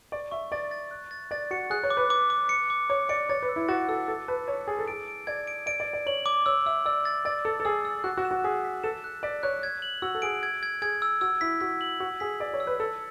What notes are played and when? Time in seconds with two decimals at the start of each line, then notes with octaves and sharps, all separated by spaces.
0.12 D5 C#6
0.31 E5 C#6
0.52 D5 A6
0.71 A6
0.91 F#6
1.11 A6
1.31 D5 A6
1.51 F#4 C#7
1.70 G#4 F#6
1.83 C#5
1.90 D6
1.97 B4
2.10 D6
2.30 D6
2.49 C#7
2.70 D6
2.90 C#5 D6
3.09 D5 C#7
3.29 C#5 A6
3.42 B4
3.49 E6
3.56 E4
3.68 F#4 A6
3.89 A4 E6
4.08 A4 A6
4.28 B4 A5
4.47 C#5 A5
4.68 G#4 A6
4.79 A4
4.88 G#4 D7
5.08 D7
5.27 D5 G#6
5.47 D7
5.66 D5 D7
5.80 D5
5.87 D7
5.93 D5
6.06 C#5 F#7
6.26 D6
6.46 C#5 E6
6.66 E5 E6
6.85 D5 E6
7.05 A6
7.25 D5 A6
7.45 A4 E6
7.60 A4
7.65 G#4 E6
7.85 E6
8.04 F#4 F#6
8.17 F#4
8.25 E7
8.31 F#4
8.44 G#4 B6
8.65 B6
8.83 A4 E7
9.04 F#6
9.23 D5 B6
9.43 C#5 F#6
9.63 G#6
9.82 F#7
10.02 F#4 E6
10.15 A4
10.22 G#4 D7
10.43 G#6
10.63 G#6
10.82 G#4 G#6
11.02 E6
11.21 F#4 E6
11.41 E4 B6
11.61 F#4 B6
11.81 F#7
12.00 F#4 F#7
12.20 G#4 B6
12.40 D5 E6
12.54 C#5
12.60 E6
12.67 B4
12.80 A4 E6